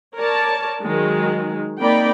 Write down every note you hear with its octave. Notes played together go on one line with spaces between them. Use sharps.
A#4 C#5 D5 A5
D#3 F#3 G#3
A#3 C4 D#4 D5 G5 B5